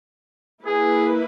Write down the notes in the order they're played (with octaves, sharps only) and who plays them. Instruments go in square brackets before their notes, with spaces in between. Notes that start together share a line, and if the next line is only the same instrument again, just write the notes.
[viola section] A#3 E4 B4 [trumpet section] G#4